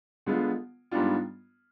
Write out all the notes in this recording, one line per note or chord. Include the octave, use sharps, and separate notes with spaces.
D3 G#3 B3 F4
G#2 G3 B3 D4 F4